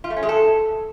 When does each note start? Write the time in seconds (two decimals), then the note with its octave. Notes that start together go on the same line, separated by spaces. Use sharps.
0.04 F4
0.10 A3
0.16 C#4
0.23 G#3
0.29 A4